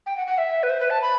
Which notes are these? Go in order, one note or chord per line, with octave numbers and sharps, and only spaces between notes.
G5
F#5
F#5
E5
B4
C5
B4
A5
B5